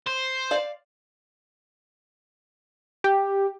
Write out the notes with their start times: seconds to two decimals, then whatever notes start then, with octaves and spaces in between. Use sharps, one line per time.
0.07 C5
0.51 D5 F5
3.04 G4